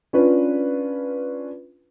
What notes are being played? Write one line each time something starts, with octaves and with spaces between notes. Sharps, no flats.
C#4 D4 F4 B4